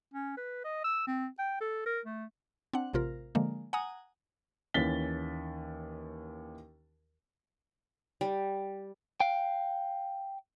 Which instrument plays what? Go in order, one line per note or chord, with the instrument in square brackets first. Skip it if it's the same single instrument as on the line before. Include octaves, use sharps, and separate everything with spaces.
[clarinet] C#4
B4
D#5
E6
C4
G5
A4
A#4
A3
[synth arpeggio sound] C4 D4 F#5
A1 C3 F4 A#4
D3 F3 G#3 A#3
F#5 G#5 A#5 D#6
[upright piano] D#2 E3 C#4 A6 B6 G7
[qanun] G3
[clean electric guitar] F5 G5